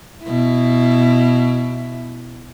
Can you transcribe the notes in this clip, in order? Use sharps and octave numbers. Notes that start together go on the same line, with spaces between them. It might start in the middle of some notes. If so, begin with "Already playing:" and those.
B2 E4